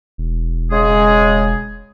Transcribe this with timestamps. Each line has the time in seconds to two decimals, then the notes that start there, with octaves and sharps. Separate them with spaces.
0.18 E1
0.71 C#3 G#3 G#4